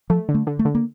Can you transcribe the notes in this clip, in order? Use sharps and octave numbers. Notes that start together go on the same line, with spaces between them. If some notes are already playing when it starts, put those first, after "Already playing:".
F3 A3
D3
A3
D3
A3
D3
A#3